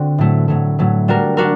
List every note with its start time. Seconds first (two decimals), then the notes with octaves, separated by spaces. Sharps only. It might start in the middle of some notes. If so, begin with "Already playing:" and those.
Already playing: D3 C4 F#4
0.18 A2 F#3 A3
0.48 A2 F#3 A3
0.79 A2 F#3 A3
1.08 G3 D4 F#4 A#4
1.37 D4 F#4 A#4